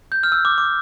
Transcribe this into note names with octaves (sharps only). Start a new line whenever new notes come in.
G6
F6
E6
D6
D6